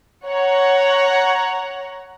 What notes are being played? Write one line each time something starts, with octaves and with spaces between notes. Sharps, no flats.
C#5 F#5 A#5